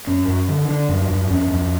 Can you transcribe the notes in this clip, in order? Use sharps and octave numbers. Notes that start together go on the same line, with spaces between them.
F#2 C#4
F#2
D3
D3 D4
F#2
F#2
F2 C#4
F2